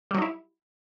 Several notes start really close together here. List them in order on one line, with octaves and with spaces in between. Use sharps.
G3 F#3 D#4 E4